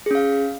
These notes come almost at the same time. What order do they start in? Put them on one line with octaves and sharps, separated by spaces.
G#4 C#4 F5